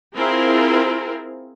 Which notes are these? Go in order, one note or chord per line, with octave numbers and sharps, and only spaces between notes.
C4 E4 F4 G#4 A#4